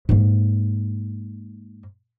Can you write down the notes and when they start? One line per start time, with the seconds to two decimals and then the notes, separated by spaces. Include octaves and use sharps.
0.09 G#2 A#3